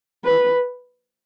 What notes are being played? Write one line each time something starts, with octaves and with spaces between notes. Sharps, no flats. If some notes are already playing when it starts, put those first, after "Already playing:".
B4